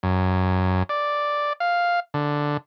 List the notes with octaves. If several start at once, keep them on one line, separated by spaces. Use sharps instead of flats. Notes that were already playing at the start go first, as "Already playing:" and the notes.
F#2
D5
F5
D3